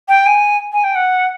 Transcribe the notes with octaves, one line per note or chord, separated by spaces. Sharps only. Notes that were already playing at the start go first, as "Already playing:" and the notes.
G5
G#5
G#5
G5
F#5